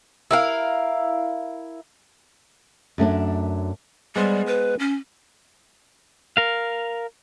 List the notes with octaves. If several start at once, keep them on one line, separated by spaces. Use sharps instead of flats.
E4 A#4 F5
F#2 A3 C#4 D4
G3 G#3 B3 C5
B4
C#4
A#4 F5